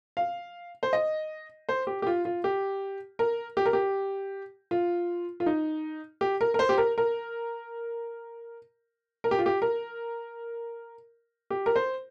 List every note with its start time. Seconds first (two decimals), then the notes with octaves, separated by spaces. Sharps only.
0.17 F5
0.83 C5
0.93 D#5
1.69 C5
1.87 G4
2.02 G4
2.07 F4
2.25 F4
2.44 G4
3.19 A#4
3.57 G4
3.66 A#4
3.73 G4
4.71 F4
5.40 F4
5.46 D#4
6.21 G4
6.41 A#4
6.54 A#4
6.59 C5
6.69 G4
6.78 A#4
6.98 A#4
9.24 A#4
9.31 G4
9.39 F4
9.46 G4
9.62 A#4
11.50 G4
11.66 A#4
11.76 C5